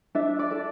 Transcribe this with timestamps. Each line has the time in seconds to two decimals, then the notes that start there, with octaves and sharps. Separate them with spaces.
0.15 D4 E5
0.39 D5
0.51 A4